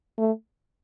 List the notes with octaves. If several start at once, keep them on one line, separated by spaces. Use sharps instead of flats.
A3